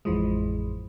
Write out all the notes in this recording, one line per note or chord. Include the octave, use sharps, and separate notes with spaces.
A1 F2 E3 F3 G#3